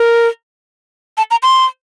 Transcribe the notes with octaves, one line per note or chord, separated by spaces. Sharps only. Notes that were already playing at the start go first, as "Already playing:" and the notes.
Already playing: A#4
A5
A#5
C6